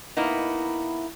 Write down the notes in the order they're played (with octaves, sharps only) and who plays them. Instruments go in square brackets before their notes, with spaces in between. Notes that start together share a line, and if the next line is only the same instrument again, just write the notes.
[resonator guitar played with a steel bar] A#3 B3 D#4 [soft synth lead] E4